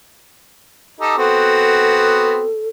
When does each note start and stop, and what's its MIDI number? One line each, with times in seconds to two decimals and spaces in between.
1.00 1.13 63
1.00 1.13 67
1.00 1.13 69
1.17 2.46 59
1.17 2.46 60
1.17 2.46 66
1.17 2.69 69